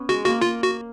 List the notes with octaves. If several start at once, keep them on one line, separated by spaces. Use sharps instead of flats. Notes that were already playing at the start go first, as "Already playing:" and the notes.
Already playing: B3 C#4
G#3 F#4
A#3 F#4
A#3 F4
F#4